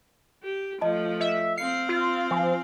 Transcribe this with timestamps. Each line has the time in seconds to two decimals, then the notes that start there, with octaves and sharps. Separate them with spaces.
0.43 G4
0.81 F3 A3 D#5 A5
1.21 D#5 E5
1.58 C4 F5 C7 C#7
1.89 F4
2.31 F3 G#5